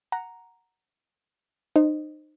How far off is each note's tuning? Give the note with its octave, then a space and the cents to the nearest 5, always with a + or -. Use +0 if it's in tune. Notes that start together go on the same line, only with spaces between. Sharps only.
F#5 +0 A#5 +0
D#4 -35 C5 +0 D#5 -10